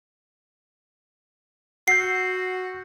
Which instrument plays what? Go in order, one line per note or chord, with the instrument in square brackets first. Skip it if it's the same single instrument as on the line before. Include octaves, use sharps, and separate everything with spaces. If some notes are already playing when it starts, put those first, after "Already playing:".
[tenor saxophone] F#4 [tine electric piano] F#5 E6 G6 [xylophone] C7